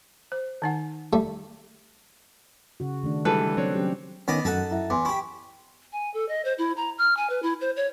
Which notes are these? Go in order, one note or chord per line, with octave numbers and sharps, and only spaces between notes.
C5
D#3 D#4 F#5
G3 A3
C#3 F#4
D#3 A3 D4
E3 G3 G#3 A4 B4
F#3 G3 C4 D4 C#5
F#3 C#4 G4
D#3 B3 C#4 D5 D#5
F#2 D#4 A4 F#5 A5
E4 E5
E2 G#5 C6 D6
E4 G4 C#6
G#5
A4
D#5
C5
E4
A#5
F6
G#5
B4
E4
C5
C#5